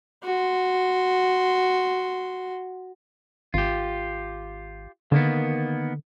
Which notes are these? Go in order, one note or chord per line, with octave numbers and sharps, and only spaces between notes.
F#4 C6
G#1 F4 G4
D3 D#3 A#3 B3